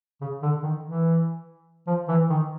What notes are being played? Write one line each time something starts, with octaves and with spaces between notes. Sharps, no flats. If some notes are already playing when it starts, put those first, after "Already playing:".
C#3
D3
D#3
E3
F3
E3
D#3